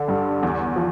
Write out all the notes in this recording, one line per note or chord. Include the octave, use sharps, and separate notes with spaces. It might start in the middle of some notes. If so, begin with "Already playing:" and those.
Already playing: D3
G2
E2
F3